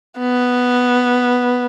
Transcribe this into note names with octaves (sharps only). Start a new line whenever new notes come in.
B3